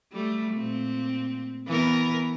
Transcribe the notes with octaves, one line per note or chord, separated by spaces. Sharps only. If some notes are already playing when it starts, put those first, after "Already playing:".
G3 A3
A#2 C4
E3 B3 A#4